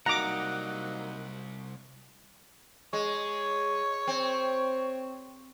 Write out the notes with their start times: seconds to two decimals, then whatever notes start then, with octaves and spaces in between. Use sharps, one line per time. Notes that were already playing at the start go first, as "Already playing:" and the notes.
0.06 C2 F#3 A#3 D#4 F#5 A#5 D6
2.93 G#3 C#5
4.08 C4